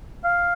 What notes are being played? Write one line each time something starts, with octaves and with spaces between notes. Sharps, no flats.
F5